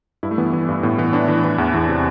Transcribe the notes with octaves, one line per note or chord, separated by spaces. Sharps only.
G2 E4
A3
E3 B3
E3
G2
A2 B3
E3 B3
A2 D4
E3
E3
E2
E2 E4
C3